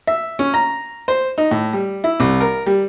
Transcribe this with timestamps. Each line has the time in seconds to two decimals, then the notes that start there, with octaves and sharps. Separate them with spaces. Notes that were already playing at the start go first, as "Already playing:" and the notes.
0.07 E5
0.39 C#4
0.54 A#5
1.08 C5
1.38 D#4
1.51 A2
1.73 G3
2.04 E4
2.20 C2
2.41 A#4
2.66 G3